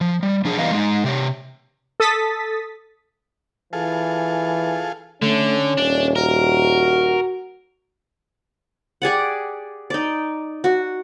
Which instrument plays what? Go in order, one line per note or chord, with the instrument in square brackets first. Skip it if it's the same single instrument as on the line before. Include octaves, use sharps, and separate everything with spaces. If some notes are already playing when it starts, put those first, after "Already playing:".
[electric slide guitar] F3
G3
F3 D4 G#4
E3 G3 B3 D#4 F5
G#3 D#4
C3 G4 C#5
[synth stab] A4 D#6 A6 B6
[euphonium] E3 [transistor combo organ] F4 G#4 A4
[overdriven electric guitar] D3 [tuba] A3 [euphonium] C#4
[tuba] D#1 [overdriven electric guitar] D4
[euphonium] F#4 [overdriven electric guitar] A#4
[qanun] G4 G#4 D5 F#5
D#4 D5
F#4